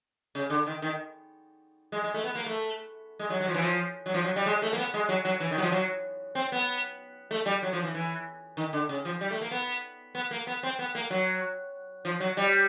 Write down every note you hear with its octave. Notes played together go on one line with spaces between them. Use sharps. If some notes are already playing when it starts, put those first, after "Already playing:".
C#3
D3
D#3
D#3
G#3
G#3
A3
B3
A#3
A3
G#3
F#3
F#3
F3
E3
F3
F#3
F3
F#3
G3
G#3
A3
A#3
B3
G#3
F#3
F#3
E3
D#3
F#3
F3
F#3
C4
B3
A3
G3
F#3
F3
E3
E3
D#3
D3
C#3
F3
G3
A3
A#3
B3
B3
A#3
B3
C4
B3
A#3
F#3
F3
F#3
G3